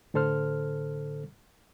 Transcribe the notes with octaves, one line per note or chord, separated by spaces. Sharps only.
A2 D3 A4 C5 F6